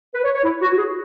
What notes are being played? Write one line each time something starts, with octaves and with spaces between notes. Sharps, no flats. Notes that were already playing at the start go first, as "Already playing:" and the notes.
B4
C#5
C#5
E4
F#4
F#4
G#4